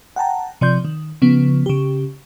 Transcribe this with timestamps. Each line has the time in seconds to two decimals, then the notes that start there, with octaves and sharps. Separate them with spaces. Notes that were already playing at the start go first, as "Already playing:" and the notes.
0.16 F#5 G5 A5 A#5
0.61 C3 F3 D5 C6 G6
0.85 D#3
1.22 C#3 F3 B3
1.66 C#3 G4